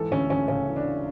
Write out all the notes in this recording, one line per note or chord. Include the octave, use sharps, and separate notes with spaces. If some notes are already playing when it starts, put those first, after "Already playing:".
Already playing: G#2 E3 A4
D2 C#4
D2 C#4
C#3 C#4
E3
D4